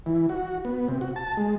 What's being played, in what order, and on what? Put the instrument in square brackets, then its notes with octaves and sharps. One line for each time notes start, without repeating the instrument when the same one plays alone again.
[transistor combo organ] E3
F#4
B3
C3
F#4
A5
G#3